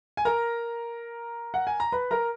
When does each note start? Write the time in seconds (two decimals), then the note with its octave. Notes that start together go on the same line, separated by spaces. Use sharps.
0.17 G#5
0.25 A#4 A#5
1.54 F#5
1.67 G#5
1.80 A#5
1.92 B4 B5
2.11 A#4 A#5